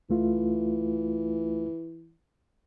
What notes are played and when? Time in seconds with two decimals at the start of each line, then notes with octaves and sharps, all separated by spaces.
0.10 C#2 E3 A3 F4